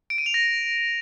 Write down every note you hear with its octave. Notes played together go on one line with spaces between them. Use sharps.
D7
D#7
F7
A#6